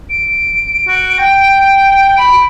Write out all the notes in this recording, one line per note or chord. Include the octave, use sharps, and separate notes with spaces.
D7
F#4
G5
B5